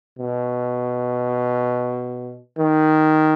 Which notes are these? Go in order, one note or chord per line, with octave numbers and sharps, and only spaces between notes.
B2
D#3